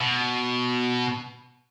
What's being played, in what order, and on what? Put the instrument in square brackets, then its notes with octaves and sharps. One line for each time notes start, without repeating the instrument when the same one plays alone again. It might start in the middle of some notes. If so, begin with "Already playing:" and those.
[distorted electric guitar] B2